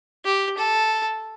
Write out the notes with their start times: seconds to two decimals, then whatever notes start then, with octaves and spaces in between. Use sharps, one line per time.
0.25 G4
0.58 A4